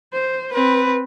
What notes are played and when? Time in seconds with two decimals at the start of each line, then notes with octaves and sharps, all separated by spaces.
0.13 C5
0.53 C4 B4